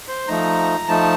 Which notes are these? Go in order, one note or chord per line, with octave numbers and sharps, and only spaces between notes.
C5
F3 A3 D#4 A#5
F3 A3 D#4 A5